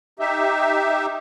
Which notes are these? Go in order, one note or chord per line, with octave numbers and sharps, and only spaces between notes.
D#4 G4 E5